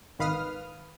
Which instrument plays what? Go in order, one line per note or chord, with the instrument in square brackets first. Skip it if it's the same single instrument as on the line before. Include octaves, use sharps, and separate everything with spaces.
[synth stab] G#1 D#3 B4 F5 D#6 F6